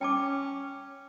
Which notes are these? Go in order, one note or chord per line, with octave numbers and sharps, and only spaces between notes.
C#4 G5 A5 D6